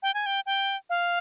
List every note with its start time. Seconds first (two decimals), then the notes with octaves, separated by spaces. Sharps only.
0.03 G5
0.14 G#5
0.26 G5
0.46 G5
0.90 F5